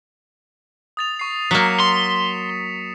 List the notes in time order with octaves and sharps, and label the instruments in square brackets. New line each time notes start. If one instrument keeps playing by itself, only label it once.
[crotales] D#6 A6 F7
C#6 C7
[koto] F#3 A#3 [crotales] B6 C#7 E7
[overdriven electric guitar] C6